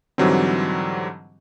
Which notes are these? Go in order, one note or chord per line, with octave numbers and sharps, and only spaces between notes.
G#2 D3 E3 F#3 G3 C4